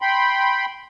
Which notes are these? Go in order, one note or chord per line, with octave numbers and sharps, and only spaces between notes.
G5 B5 C6